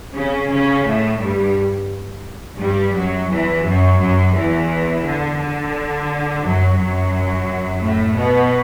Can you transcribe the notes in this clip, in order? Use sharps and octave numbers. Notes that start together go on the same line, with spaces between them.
C#3 C#4
C#3 C#4
A2 A3
G2 G3
G2 G3
F#2 F#3
E2 E3
F#2 F#3
F#2 F#3
E2 E3
D3
D3
F#2 F#3
F#2 F#3
A2 A3
B2 B3